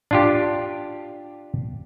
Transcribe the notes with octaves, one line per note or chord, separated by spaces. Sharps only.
D4 F4 G4